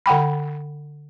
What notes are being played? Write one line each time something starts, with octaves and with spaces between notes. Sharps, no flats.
D3 F#5 G5 B5